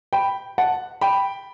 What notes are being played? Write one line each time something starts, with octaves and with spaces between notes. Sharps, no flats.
G5 B5
F#5 A5
G5 B5